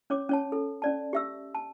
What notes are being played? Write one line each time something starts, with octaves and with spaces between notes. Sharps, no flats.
C#4 C#5 D6
C#4 C#5 A5
A4
C#4 D5 A5
G4 E5 E6
A5